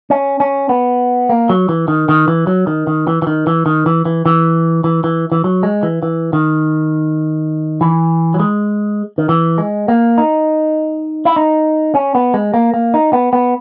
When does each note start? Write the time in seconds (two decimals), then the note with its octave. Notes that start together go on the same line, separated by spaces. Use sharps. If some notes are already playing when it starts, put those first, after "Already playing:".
0.10 C#4
0.40 C#4
0.69 B3
1.29 A#3
1.49 F#3
1.69 E3
1.88 D#3
2.09 D#3
2.28 E3
2.47 F#3
2.67 D#3
2.87 D#3
3.07 E3
3.22 E3
3.27 D#3
3.47 E3
3.66 D#3
3.86 E3
4.05 E3
4.26 E3
4.84 E3
5.04 E3
5.32 E3
5.44 F#3
5.63 G#3
5.83 E3
6.03 E3
6.33 D#3
7.81 E3
8.34 F#3
8.40 G#3
9.18 D#3
9.29 E3
9.58 G#3
9.88 A#3
10.18 D#4
11.25 E4
11.36 D#4
11.95 C#4
12.15 B3
12.34 G#3
12.54 A#3
12.74 A#3
12.94 D#4
13.13 B3
13.33 B3